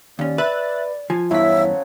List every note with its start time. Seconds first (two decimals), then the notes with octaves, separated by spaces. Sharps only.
0.19 D#2 C#4 D5
0.38 B4 E5 F#6 A6
1.10 F3 G#5
1.31 E2 G2 C#3 F3 F#3 E4 E5 B6